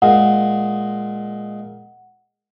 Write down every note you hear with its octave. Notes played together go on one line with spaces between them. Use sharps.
A#2 G#3 F#5